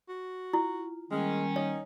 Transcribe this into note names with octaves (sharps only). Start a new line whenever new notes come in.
F#4
E4 F4
D#3 G3 G#3 A#3 C#4
D#4 C#5